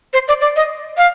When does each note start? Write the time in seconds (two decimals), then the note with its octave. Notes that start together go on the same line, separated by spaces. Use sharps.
0.13 C5
0.28 D5
0.41 D5
0.56 D#5
0.98 F5